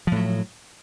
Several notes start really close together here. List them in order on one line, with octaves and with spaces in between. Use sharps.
F3 A2 F#3